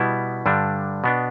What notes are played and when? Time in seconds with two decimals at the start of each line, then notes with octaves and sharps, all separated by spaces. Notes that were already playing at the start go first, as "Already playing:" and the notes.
Already playing: B2 G3 B3 E4
0.46 G2 D3 G3 D4
1.04 B2 B3 D4